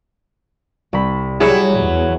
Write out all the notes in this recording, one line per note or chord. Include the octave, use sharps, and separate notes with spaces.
C2 B5
F#3 G3 E4 G#4 C#7
E2